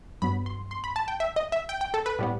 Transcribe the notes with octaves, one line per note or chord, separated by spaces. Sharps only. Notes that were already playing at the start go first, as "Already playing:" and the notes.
G2 F#3 B3 B5
C6
C6
B5
A5
G5
E5
D#5
E5
G5
G5
A4
B4
A2 G3 B3